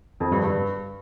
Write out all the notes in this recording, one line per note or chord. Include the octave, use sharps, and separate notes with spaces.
F2
G2
G2